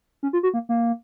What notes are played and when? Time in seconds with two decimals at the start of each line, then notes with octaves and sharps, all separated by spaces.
0.23 C#4
0.33 F4
0.43 F#4
0.54 A#3
0.69 A#3